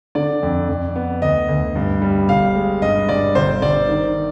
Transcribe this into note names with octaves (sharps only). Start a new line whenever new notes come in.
D3 D5
F2
F2
B3
D2 D#5
D2
G2
G3
G1 F5
G#3
G2 D#5
G2 D5
G1 C5
G1 D5
D#3